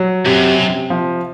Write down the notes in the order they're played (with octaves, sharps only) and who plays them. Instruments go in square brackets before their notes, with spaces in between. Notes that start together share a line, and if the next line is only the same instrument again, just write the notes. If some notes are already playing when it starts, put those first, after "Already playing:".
Already playing: [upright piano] F#3
[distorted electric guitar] F#2 [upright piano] C3
[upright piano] C3
F3